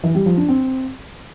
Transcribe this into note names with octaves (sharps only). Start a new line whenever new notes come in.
E3
G3
F3
D4
C4